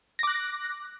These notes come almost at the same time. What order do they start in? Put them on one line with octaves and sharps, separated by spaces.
A#6 D6 F#6